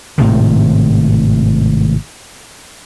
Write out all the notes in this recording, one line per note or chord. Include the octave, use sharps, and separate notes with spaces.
G#1 A2 C3 D#3